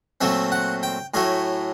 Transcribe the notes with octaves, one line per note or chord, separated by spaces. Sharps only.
A#2 F#3 A3 C4 E5
F#5
G5
A2 F#3 A3 G#5